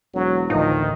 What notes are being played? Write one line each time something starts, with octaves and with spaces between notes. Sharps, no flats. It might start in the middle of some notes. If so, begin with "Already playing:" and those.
E1 F#3
A1 D2 D#3 F3 D#4